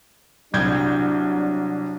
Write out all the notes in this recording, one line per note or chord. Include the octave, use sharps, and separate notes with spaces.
C2 F#3 D4 G6 G#6